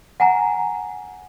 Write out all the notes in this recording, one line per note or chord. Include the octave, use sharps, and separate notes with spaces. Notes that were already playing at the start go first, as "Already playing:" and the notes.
F#5 G#5 A#5